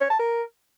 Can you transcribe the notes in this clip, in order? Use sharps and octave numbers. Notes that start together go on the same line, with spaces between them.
C#5
A5
A#4